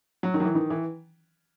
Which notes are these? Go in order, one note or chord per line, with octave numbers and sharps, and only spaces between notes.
F#3
D#3
F#3
E3
D#3
E3